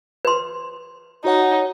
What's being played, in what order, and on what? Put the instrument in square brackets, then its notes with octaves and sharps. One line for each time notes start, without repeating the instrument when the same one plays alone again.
[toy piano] B4 C6
[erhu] D#4 [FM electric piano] F#4 C#5 F#5